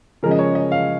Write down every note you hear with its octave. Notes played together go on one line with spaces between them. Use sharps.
C#3 F3 G#3 A#4
D#5
C#5
D#5
F5